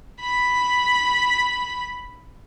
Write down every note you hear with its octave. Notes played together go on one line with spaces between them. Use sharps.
B5 B6